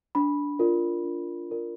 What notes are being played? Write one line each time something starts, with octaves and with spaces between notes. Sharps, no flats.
D4 B5
F4 A#4 D5
D4
F4 A#4 D5